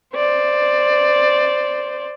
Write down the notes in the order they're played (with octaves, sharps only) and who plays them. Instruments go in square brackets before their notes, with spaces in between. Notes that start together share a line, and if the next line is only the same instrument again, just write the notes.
[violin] C5 D5